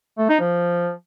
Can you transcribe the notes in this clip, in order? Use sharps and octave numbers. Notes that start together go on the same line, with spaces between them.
A3
D#4
F3